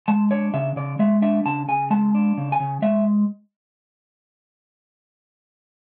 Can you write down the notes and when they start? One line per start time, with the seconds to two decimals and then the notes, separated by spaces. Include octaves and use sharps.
0.08 G#3 A5
0.31 D4 C#5
0.54 C#3 E5
0.76 C#3 D5
0.99 G#3 E5
1.22 D4 E5
1.46 C#3 A5
1.68 C#3 G#5
1.90 G#3 A5
2.15 D4
2.37 C#3
2.52 G#5
2.60 C#3
2.82 G#3 E5